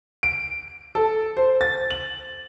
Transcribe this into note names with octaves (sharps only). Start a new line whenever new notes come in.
D7
A4
C5
A6
F#7